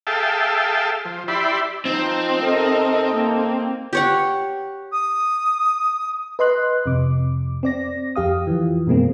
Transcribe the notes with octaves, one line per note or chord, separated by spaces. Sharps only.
G#4 A4 E5 F5 G5 A5
F3
E4 G4 D5 E5 B5 C6
F3 C4 D#4
C3 D#4 A4 A#4 D#5
A#3
G4 C#5 F#5
D#6
B4 D#5 C6 F#6
F2 C3 D6
C4 D5 A#6
F2 G4 F5 D#6
E3 F3
F#2 B2 G#3 A#3 C4